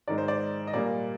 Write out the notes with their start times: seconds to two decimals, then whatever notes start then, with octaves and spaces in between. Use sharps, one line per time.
0.08 G#2 D#3 G#3 D5
0.18 C5
0.28 D5
0.67 D#5
0.74 A#2 G3 A#3 D5